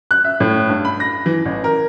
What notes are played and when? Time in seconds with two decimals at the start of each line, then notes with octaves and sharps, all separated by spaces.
0.11 F#6
0.25 E5
0.40 A2
0.69 G2
0.85 B5
1.00 A#6
1.26 E3
1.45 A1
1.64 A#4